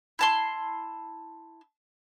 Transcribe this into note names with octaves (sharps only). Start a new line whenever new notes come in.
E4 A5 C6